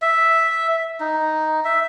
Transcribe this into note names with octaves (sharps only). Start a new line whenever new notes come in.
E5
D#4
E5